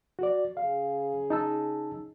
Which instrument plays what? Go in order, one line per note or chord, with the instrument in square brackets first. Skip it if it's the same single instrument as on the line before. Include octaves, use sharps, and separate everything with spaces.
[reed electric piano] F#4 D5
[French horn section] C#3 G#4 [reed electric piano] F5
[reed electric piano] D#4 A5 E6